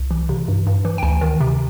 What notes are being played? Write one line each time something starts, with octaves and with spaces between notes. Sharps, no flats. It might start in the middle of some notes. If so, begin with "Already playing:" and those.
Already playing: C2
E3
C3
G2
G2
E3
G5
D2 G#5
D#3
C3